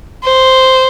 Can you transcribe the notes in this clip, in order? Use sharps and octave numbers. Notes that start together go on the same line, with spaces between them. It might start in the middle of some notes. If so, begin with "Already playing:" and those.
C5